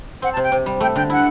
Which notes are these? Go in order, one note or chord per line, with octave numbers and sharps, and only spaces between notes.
C4 F#5
A5
C3
G5
C3
G3
A3 G5
D3 G5
E4 F#5